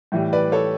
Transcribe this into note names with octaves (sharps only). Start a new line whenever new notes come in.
A2 E3 G3
B4 D5
A4 C#5